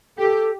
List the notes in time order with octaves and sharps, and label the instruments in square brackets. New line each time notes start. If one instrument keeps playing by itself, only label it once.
[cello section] G4 [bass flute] A4